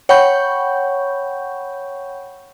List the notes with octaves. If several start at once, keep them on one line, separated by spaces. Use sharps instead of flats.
C#5 F#5 G5 B5 C#6 G6